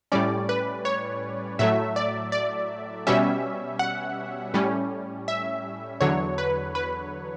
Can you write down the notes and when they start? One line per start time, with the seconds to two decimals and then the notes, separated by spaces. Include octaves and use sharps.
0.12 A2 G3 C#4 D5
0.49 B4
0.85 C#5
1.59 A2 F#3 A3 E5
1.96 D5
2.32 D5
3.07 B2 G3 C#4 E5
3.79 F#5
4.54 A2 G3 C#4
5.28 E5
6.00 E2 D3 F#3 C#5
6.38 B4
6.75 B4